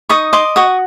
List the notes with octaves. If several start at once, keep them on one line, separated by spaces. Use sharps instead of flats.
D#4 C#6 D#6
D#5 C6 D6
F#4 C#6 D#6